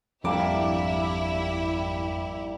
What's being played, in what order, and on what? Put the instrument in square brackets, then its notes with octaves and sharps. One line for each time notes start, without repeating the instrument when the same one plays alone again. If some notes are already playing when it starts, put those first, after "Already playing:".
[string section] G#1 E4 G4 [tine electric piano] F2 D6 [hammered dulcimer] G3 A#3 D4